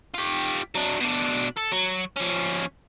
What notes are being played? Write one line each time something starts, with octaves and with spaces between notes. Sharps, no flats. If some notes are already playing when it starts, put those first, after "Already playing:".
F4 G4
F#3 D4
B2 D4
A4
F#3
F3 C#4